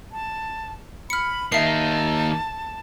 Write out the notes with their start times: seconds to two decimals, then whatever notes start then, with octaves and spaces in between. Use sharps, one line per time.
0.12 A5
1.10 B5 F6 C#7
1.52 D#3 A#3 E5 A5 C7